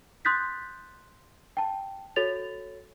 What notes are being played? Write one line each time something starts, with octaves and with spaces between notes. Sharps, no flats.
C6 D#6 F#6 G6 A6 B6
G5 A5
F#4 A4 C#5 A6 F7